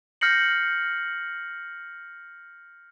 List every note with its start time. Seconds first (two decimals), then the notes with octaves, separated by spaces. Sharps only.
0.21 F6 G6 A#6 C7 C#7 F#7